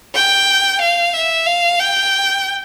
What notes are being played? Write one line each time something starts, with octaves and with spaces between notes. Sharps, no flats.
G5
F5
E5
F5
G5